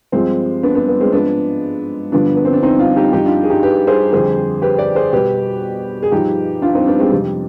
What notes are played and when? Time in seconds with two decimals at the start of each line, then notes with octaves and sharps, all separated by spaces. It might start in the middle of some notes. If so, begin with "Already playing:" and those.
0.12 G2 F3 G#3 C4
0.63 B3 D4
0.75 B3 D4
0.88 B3
1.00 G#3 C4
1.12 G#2 F3 B3 D4
2.12 G2 D3 F3 B3 D4
2.36 B3
2.45 C4
2.53 D4
2.62 C4 D#4
2.79 D4 F4
2.96 D#4 G4
3.13 G2 F3 D#4 G4
3.25 D4 F4
3.44 G#4
3.50 D#4 G4
3.63 G4 B4
3.87 G#4 C5
4.13 F2 D3 G3 G#4 C5
4.62 G4 B4
4.79 B4 D5
4.95 G#4 C5
5.13 B2 G3 G4 B4
6.03 G#4
6.12 G2 F3 D#4 G4
6.62 D4 F4
6.74 C4 D#4
6.87 B3 D4
7.00 G#3 C4
7.12 F2 C3 G3